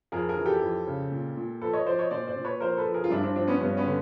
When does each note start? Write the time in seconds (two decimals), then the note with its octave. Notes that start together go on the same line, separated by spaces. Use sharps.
0.12 F2 G#4 A#4
0.29 G#4 A#4
0.37 E3
0.45 G4 A4
0.62 F2
0.87 C#3
1.12 A#2
1.37 A#2
1.61 F3 A4 B4
1.73 C#5 D#5
1.86 F3 C5 D5
1.99 C#5 D#5
2.11 A#2 C5 D5
2.28 C5 D5
2.37 A#2
2.45 B4 C#5
2.60 F3 A#4 C5
2.77 A4 B4
2.86 F3
2.94 G#4 A#4
3.04 F4
3.10 G2 D4 E4
3.23 C4 D4
3.36 F3 C4 D4
3.48 B3 C#4
3.61 G2 B3 C#4
3.77 B3 C#4
3.86 D3